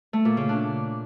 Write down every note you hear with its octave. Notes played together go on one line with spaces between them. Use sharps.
A3
A#2
C#3
D4